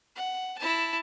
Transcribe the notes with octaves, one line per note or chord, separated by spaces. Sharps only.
F#5
E4 A5